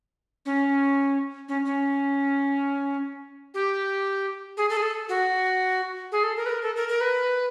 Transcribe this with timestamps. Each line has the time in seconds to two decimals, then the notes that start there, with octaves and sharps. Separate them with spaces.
0.45 C#4
1.48 C#4
1.65 C#4
3.54 G4
4.57 G#4
4.70 A4
4.77 G#4
4.82 A4
5.09 F#4
6.12 G#4
6.23 A4
6.37 A#4
6.46 B4
6.49 A#4
6.62 A4
6.76 A#4
6.89 A#4
7.01 B4